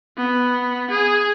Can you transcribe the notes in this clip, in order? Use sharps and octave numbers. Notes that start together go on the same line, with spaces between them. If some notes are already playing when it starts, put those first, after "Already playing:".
B3
G#4